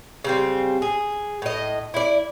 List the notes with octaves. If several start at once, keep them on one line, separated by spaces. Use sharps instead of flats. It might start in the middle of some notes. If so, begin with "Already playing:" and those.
C#3 G3 C4
G#4
A2 D#5
E4 D5